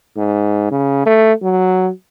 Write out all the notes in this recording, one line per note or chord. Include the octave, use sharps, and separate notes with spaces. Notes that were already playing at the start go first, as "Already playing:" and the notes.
G#2
C#3
A3
F#3